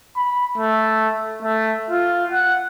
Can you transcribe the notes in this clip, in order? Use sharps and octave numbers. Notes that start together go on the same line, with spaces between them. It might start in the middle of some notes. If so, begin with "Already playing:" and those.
B5
A3
A3
F4
F#5